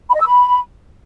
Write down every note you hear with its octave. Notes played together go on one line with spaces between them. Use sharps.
B5
D#5
E6
B5